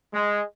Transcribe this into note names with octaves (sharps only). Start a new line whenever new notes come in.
G#3